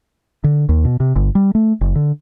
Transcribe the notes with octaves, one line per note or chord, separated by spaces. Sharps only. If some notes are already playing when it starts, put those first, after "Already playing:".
D3
D#2
B2
C3
G1
G3
A3
F#1
D3